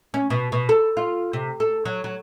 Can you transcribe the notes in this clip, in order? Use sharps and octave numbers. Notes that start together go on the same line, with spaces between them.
C#4
B2
B2
A4
F4
C3
A4
F#3
F#3